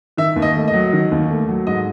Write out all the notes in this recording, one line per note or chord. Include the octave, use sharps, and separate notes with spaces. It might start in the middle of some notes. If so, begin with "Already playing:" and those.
D#3 E5
D#2
D#5
A3
D#5
F#3
D#3
D#2
A3
F#3
G#2 D#5